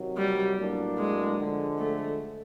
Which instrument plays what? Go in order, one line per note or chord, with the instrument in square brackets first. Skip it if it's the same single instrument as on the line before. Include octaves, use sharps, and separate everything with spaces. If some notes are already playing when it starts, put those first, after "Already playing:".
Already playing: [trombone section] C3 D#3 F#3
[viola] G3
[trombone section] A2 F#3 A#3 D4
[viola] G#3
[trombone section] D3 F3 G#3
[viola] A3